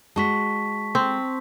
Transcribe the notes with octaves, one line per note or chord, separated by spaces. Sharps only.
G#3 F#4 A5 C#6 B6
C4